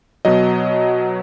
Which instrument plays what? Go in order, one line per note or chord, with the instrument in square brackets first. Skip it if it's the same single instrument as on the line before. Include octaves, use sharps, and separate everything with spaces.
[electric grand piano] B2 F#3 D#5